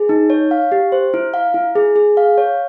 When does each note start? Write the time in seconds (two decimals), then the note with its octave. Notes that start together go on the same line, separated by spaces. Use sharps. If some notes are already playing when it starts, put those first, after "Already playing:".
Already playing: G#4
0.09 D#4
0.30 C#5
0.51 F5
0.72 G4
0.92 C5
1.14 E4
1.34 F5
1.54 E4
1.76 G#4
1.96 G#4
2.17 F5
2.38 C#5